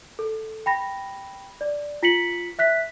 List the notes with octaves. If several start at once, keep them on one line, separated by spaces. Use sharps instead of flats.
A4
G5 B5 A#6
D5
F4 B6 C#7 F#7
E5 F#6 B6